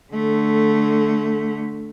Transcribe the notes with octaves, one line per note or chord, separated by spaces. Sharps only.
D3 A3